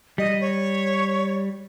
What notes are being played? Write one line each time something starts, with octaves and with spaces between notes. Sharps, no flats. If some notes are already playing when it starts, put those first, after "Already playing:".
G3 D#5
C#5